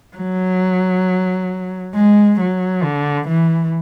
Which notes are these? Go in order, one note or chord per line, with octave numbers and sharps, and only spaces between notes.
F#3
G#3
F#3
D3
E3